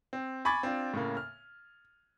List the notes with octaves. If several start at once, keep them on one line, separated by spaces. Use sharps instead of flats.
C4
G#5 B5 C#6 D6 G#6 A6
C4 D4 F4
A2 C#3 A#3
F6